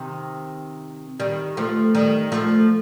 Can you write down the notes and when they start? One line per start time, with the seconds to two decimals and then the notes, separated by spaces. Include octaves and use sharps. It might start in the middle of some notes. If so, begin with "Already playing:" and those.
Already playing: C3 D#3
1.20 D#3 G3
1.57 F3 A3
1.95 D#3 G3
2.32 F3 A3